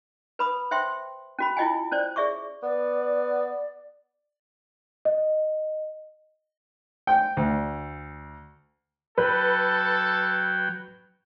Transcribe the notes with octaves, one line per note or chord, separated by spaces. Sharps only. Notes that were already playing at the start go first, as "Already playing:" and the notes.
B4 B5 D#6
C5 E5 G5 C6
C#4 F#4 B5
E4 F4 D#5 G5 G#5
C#4 C5 D5
G#4 D5 E5 C#6 D6
B3 D5
D#5
G5
D2
F#3 A4 B4 G5